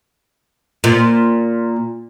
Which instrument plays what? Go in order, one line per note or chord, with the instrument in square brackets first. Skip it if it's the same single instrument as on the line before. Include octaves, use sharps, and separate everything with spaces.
[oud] A#2